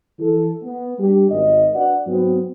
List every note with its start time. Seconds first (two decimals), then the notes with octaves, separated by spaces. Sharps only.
0.19 E3 A4
0.62 B3
0.99 G3 D4 G4
1.30 G#1 D#5
1.75 D4 F#4 B4 D5 F#5
2.07 G#2 F#3 B3 C4